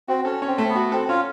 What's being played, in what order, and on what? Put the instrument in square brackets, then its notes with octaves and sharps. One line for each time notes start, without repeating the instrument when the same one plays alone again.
[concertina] C4 [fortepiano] F#4
[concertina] C#4 [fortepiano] A4
[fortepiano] C#4
[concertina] C4
[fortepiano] A3
[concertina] B3
[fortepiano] F#4
[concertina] C4 [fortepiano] A4
[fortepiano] C#4 [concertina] F4